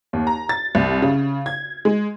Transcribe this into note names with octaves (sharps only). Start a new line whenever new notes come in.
D#2
A#5
A6
C2
C#3
G#6
G#3